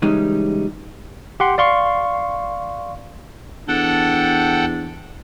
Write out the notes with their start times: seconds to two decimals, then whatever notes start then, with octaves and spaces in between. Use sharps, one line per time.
0.02 C#3 E3 G3 G#3 C#4 D#4
1.40 G4 F#5 C6
1.58 D5 F5 C6 C#6
3.68 E2 D4 A4 F#5 G5